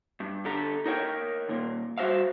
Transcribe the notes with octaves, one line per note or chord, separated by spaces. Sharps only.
G2
D3 G4 A4 A#5
D#4 A#4 C#5 G5
D#2 A#2
G3 F#4 C5 E5 F5